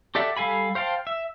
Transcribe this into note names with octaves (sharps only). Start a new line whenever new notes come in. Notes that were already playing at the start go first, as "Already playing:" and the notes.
G4 A4 D5 E5 F#5
G3 A4 F5 G#5 B5
C5 F5 G5 A5
E5